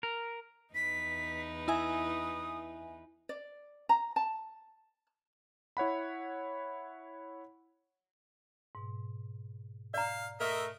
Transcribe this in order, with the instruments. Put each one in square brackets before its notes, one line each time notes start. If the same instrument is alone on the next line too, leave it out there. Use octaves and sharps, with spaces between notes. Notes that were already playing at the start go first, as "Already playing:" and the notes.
[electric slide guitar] A#4
[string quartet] E2 D#4 B4 [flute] B6
[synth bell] E4 E5 G#5 [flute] D#6
[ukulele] D5
A#5
A5
[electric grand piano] E4 C#5 F#5 B5
[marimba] G#2 B2
[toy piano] D5 A#5 [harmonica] F5
[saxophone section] A3 A#4 [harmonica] D#5 E5